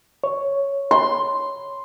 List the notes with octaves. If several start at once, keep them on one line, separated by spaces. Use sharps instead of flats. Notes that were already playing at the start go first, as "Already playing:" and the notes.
C#5
C6